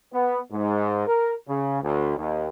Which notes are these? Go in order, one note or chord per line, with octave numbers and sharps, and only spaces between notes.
B3
G#2
A#4
C#3
D2
D#2